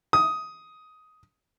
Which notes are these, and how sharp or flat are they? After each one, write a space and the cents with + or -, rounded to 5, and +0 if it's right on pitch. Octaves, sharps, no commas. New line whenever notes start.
D#6 +10